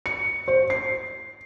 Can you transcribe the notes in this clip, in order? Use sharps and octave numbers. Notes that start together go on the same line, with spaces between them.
C#7
C5
C7